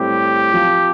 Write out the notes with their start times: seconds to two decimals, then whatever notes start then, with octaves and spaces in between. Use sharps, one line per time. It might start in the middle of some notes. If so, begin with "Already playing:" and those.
Already playing: A2 G3 C4 E4 G4
0.53 F3 C4 F4